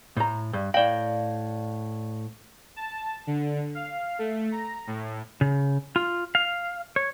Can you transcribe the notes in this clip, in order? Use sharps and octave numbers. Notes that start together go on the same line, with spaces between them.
A2 A#5
G2
A2 D5 F5 G5
A5
D3
F5
A3
A#5
A2
C#3
F4
F5
C#5